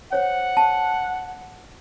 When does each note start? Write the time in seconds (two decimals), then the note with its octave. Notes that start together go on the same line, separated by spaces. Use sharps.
0.13 C5 C#5 F#5
0.57 A5